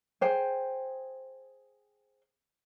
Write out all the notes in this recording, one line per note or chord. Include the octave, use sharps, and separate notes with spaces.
G#4 C5 G5